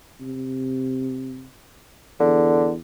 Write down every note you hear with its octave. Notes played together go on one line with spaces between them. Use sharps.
C3
E2 D3